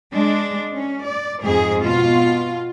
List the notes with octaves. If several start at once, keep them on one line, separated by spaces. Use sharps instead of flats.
G#3 D4
C#4
D5
F2 G#2 G#4
B2 F4